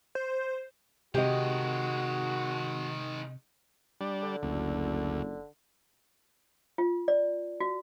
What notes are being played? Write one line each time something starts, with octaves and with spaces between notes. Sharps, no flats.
C5
C3 D#3 G#3 F#4 G4 D#5
G3 D4
D3
F#1 D2
F4
D5
F#4